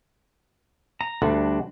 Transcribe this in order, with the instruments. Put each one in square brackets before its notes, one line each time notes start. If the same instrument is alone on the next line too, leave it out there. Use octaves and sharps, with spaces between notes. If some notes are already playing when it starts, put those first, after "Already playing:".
[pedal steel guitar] A#5
[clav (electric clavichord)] D2 [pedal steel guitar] G3 D4 F#4